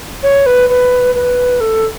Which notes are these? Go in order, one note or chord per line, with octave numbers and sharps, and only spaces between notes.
C#5
B4
B4
B4
A4